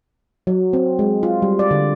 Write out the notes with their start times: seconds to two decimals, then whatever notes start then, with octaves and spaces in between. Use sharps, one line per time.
0.47 F#3
0.73 C4
0.99 G#3
1.23 F4
1.42 G3
1.59 D5
1.71 D3